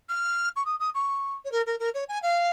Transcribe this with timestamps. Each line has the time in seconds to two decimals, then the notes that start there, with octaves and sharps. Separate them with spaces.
0.09 F6
0.56 C#6
0.65 D#6
0.79 D#6
0.94 C#6
1.44 C#5
1.51 A#4
1.66 A#4
1.79 A#4
1.94 C#5
2.08 G#5
2.22 F5